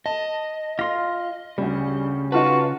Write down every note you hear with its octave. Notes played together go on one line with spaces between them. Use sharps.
D#5 A5
F4 C6 A#6
D2 C#3 G3
D#4 F4 F#4 B4 A5